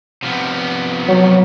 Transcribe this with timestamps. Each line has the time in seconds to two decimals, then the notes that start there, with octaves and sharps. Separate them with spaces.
0.23 C3 F3 B3
1.08 F#3